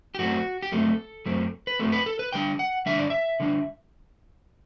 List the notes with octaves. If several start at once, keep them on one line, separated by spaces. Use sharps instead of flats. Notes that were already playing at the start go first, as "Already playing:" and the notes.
G4
F#2 F#3 A3 C4 F#4
G4
F#2 F#3 A3 C4 A4
F#2 F#3 A3 C4
B4
F#2 F#3 A3 C4 A4
B4
A4
B4
D3 G3 D4 G5
F#5
D3 G3 D4 E5
D5
E5
D3 G3 D4